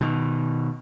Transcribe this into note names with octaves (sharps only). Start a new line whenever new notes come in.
B2 D#3